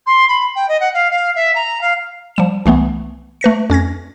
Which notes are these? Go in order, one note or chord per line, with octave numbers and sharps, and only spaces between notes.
C6
B5
G5
D#5
F#5
F5
F5
E5
A#5
F5
F3 G3 E7
C2 E3 A3 B3
A3 B4 A#6 C#7
F2 C#4 G#6 A#6